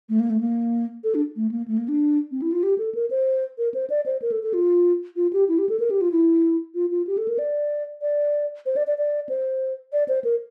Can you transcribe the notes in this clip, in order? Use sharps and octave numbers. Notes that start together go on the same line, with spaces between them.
A3
A#3
A3
A#3
A4
D4
A3
A#3
A3
A#3
D4
C4
E4
F4
G4
A4
A#4
C5
A#4
C5
D5
C5
A#4
A4
A4
F4
F4
G4
E4
G4
A4
A#4
G4
F4
E4
F4
F4
G4
A4
A#4
D5
D5
C5
D5
D5
D5
C5
D5
C5
A#4